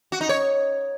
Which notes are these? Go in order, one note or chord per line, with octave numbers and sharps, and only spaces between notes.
F#4
D#4
C#5